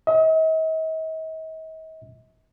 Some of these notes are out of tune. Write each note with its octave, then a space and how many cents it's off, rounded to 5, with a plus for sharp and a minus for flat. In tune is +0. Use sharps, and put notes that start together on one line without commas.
D#5 +45